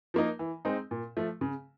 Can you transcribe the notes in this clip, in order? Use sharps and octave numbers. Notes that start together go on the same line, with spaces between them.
F3 A#3 D#4
E3
G#3 C4 D#4
A#2
F3 A3
C#3